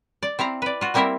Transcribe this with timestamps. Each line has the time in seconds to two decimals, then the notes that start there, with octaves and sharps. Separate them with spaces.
0.23 D5
0.39 C4 E4 F5 A#5
0.62 B4 D5
0.81 F4 F#4
0.94 G3 A#3 C4 E4 A#4 E5